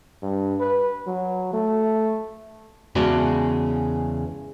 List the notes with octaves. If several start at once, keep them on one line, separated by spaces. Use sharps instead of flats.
G2
B4
F#3
A3
E2 C#3 G#3 F#4 D5 A5